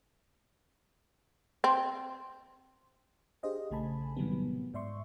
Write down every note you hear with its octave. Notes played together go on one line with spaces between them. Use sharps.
C4
D4 G4 G#4 C5 D#5 F5
A#1 C#3 A3 G#5 A5 B5
A2 C3 D#3 F#3 G3 B3
G#2 D5 E5 C6 C#6